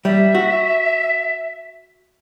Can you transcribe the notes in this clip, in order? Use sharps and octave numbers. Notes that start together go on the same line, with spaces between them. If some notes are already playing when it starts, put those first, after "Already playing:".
G3 E5
F#4